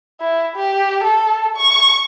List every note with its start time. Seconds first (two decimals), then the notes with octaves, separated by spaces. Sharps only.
0.21 E4
0.56 G4
1.03 A4
1.57 C#6